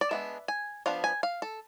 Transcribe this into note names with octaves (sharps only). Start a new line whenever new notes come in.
D5
G#3 B3 D4 E5
G#5
F3 B3 D4 F5
G#5
F5
A4